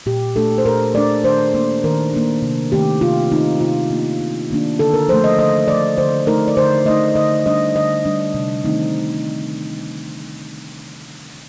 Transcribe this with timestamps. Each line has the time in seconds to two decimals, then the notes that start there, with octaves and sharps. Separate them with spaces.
0.06 A#2 G4
0.36 A3 D4 A4
0.58 C5
0.66 A#2 A#4
0.94 A3 D4 D5
1.24 D#3 C5
1.54 A#3 D4
1.84 D#3 A#4
2.13 A#3 D4
2.42 C3
2.72 D#3 A3 C4 G4
3.01 C3 F4
3.32 D#3 A3 C4 D#4
3.60 C3 F4
3.91 D#3 A#3 D4
4.20 C3
4.50 D#3 A#3 D4
4.79 D3 A4
4.94 A#4
5.09 F3 A3 C5
5.24 D#5
5.39 D3 D#5
5.68 F3 A3 D5
5.98 D3 C5
6.27 A3 D#4 A#4
6.48 D5
6.57 D3 C5
6.86 A3 D#4 D#5
7.15 D3 D#5
7.46 G3 D4 D#5
7.75 D3 D#5
8.05 G3 D4
8.34 C3
8.64 D#3 A3 C4 D#4